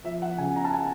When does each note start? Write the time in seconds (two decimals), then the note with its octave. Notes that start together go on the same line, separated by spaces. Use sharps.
0.04 F3 E5
0.22 F#5
0.38 C#3 G#5
0.56 A#5
0.65 A5
0.73 G#5